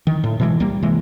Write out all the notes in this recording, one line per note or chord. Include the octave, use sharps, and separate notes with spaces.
D#3
A2
B2 E3 G#3
C2 G3 A#3
C3 E3 G#3